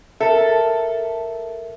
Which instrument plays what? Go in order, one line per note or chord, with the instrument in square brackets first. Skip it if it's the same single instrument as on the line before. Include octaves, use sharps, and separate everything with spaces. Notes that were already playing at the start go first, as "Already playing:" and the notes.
[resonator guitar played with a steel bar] A4 [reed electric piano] A#4 E5